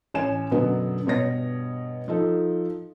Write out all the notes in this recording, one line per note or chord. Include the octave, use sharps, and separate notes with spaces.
A1 C#5 G#5 E7
F#2 B2 D3 F#3 B3
G2 B2 C#5 A#6
F3 D#4 A4